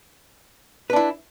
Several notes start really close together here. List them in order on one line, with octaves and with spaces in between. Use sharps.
B4 D4 E4